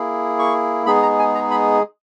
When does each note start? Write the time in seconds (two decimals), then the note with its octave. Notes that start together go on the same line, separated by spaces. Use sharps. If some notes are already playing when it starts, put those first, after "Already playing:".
Already playing: A#3 E4 G#4
0.39 C#6
0.86 G#3 B3 D#4 G#4 B5
1.02 A#5
1.19 G#5
1.35 A#5
1.51 B5